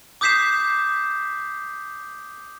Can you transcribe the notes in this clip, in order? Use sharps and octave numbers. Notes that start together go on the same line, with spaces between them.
D6 D#6 G6 B6 C7 E7